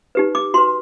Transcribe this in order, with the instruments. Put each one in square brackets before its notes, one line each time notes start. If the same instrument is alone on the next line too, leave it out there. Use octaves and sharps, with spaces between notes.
[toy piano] D#4 G4 B4
D6
F#4 B4 C6